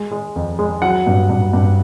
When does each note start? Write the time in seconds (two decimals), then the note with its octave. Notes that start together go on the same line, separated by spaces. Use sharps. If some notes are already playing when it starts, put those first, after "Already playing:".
Already playing: G#3
0.11 G#3
0.36 F2
0.59 G#3
0.82 F#3 F#5
1.07 G2
1.30 G2
1.53 G2